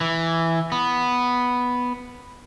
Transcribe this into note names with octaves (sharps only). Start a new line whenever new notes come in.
E3
B3